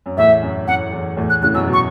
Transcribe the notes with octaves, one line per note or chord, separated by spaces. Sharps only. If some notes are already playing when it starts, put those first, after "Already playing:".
F#2
E2 A2 E5
F#2
F#2 F#5
E2
E2 A2
F#6
A2 C#3 F#6
F#2 B2 E6
B2
C#6